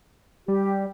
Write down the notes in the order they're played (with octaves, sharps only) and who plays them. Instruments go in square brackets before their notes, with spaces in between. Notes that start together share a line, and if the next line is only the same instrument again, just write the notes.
[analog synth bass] G3 [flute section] G4